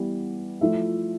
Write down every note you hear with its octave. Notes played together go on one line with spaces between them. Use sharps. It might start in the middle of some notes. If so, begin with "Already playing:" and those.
Already playing: E3 G3 B3
F3 A3 E4 A4 E5